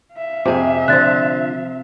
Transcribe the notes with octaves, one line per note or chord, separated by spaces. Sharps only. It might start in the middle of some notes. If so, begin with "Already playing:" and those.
E5 F5
F2 C3 G#4
D3 F3 F#6 A6